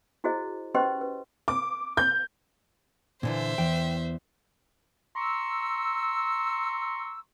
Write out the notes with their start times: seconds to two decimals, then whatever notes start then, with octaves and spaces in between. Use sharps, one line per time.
0.24 E4 F#4 G#4 C5 D#5
0.75 C#4 G4 B4 C5 D#5 C6
1.01 B4
1.48 D6
1.97 G6
3.23 A#2 D3 E3 C5 E5
3.58 E2 G5
5.16 A#5 C6 C#6 E6